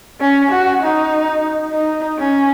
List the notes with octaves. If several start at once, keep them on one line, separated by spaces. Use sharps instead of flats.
C#4
F#4
D#4
D#4
C#4